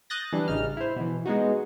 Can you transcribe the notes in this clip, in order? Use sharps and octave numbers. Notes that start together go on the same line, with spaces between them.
D#6 F#6 G6 A6 A#6
E3 G3 D4
A1 C#3 D#4 F6
E4 C5
B2 E3
G#3 B3 D#4 F#4